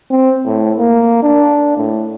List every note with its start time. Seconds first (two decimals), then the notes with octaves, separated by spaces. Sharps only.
0.10 C4
0.45 A2
0.77 A#3
1.23 D4
1.77 A2